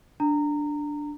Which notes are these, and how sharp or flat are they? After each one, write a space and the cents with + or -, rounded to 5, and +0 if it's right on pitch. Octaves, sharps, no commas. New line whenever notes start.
D4 +0 A#5 -20